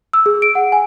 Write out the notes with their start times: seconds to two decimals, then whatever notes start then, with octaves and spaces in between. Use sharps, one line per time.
0.13 E6
0.26 G#4
0.42 D7
0.55 F#5
0.72 G#5